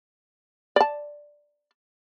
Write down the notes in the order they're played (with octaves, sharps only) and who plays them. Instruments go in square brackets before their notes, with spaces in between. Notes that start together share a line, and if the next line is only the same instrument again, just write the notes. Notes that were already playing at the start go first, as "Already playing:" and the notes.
[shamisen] D5 A5